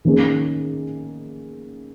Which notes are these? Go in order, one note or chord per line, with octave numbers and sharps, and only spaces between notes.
D#3 A#3 C#4 G#4